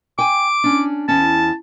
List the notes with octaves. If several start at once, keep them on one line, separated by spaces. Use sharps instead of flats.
G5 G#5 D6
C#4 D4
E2 C#4 A5